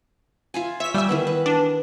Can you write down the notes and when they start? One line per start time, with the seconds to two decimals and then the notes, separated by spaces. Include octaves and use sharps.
0.54 F4 E5 G#5
0.80 C#5 E5 B6
0.94 G3 E5 G5 G#5
1.09 D#3 E3 B3
1.27 B4
1.46 D4 D#5